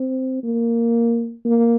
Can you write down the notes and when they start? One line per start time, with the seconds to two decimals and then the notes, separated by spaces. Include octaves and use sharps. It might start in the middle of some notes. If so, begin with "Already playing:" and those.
Already playing: C4
0.43 A#3
1.45 A#3